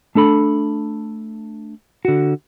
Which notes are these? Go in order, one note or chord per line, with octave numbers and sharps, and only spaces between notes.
A3 D4 A4 B5
D3 F#4